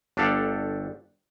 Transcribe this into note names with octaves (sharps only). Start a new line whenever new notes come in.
G1 D4 G4 A4 F5 F#5